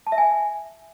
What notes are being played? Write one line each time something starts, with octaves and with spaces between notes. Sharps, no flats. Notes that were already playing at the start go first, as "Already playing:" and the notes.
A5
E5
G#5